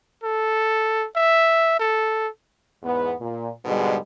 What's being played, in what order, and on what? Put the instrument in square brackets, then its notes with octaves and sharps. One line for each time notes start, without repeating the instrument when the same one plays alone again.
[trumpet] A4
E5
A4
[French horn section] E2 G#2 B3
A#2
G#2 B2 D3 G3 G#3